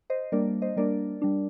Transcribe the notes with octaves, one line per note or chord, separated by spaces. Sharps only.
C5 D#5
G3 A#3 D4 A#4 D5
C5 D#5
G3 A#3 D4 A#4 D5
G3 D4